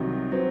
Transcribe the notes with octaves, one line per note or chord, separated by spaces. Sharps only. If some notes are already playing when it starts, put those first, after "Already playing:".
Already playing: C2 C3 D#3 F#3
F#3 C4